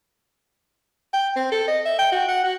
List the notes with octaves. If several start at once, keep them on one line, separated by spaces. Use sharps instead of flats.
G5
C4
A4
D#5
E5
G5
F#4
F#5
F#4